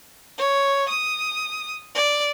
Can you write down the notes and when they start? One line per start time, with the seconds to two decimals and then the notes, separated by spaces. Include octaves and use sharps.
0.39 C#5
0.89 D#6
1.95 D5